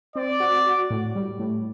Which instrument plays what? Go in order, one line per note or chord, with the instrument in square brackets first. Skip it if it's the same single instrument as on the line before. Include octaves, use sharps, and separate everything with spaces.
[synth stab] C4 [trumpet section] D5
[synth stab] F#4
F#4
A2
G3
A2